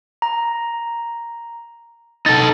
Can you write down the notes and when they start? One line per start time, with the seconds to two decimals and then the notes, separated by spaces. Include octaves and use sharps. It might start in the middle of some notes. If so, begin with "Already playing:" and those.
0.22 A#5
2.26 D#4 A4 A6